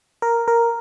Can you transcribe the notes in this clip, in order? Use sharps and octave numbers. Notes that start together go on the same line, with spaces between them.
A#4
A#4